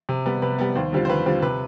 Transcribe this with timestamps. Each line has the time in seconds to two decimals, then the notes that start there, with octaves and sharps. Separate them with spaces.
0.09 C3
0.26 G3 B3
0.42 C3 B4
0.59 G3 B3
0.75 D#2 C5
0.93 D3 G3 C4 F4
1.05 C5
1.09 D#2 B4
1.26 D3 G3 C4 F4
1.42 C3 B4